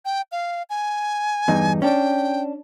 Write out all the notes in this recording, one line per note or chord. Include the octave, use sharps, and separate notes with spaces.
G5
F5
G#5
E2 G2 D#4
C#4 D4 G5